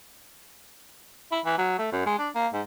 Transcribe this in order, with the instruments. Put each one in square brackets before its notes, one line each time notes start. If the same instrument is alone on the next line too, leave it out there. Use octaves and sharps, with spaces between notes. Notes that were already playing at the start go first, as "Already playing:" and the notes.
[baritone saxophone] E4
E3
F#3
A3
F#2
G#3
D4
A#3
G#2